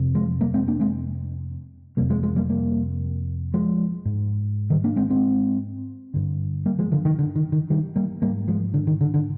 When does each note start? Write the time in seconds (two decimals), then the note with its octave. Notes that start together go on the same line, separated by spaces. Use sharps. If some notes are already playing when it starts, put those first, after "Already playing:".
Already playing: F2 C3
0.15 F3 G#3
0.41 G3 A#3
0.54 G#3 C4
0.68 A#3 D4
0.80 G#3 C4
1.97 F2 C3 G3 A#3
2.10 F3 G#3
2.23 F3 G#3
2.36 G3 A#3
2.50 G3 A#3
3.54 F3 G#3
4.05 G#2
4.70 D#3 G3
4.84 A#3 D4
4.96 G#3 C4
5.10 G#3 C4
6.14 G2 D3
6.66 G3 A#3
6.79 F3 G#3
6.92 D3 F3
7.05 D#3
7.19 D3
7.36 D#3
7.52 D#3
7.70 D#3 G3
7.96 G3 A#3
8.22 G#2 G3 A#3
8.48 F3 G#3
8.74 D3
8.87 D#3
9.01 D3
9.14 D3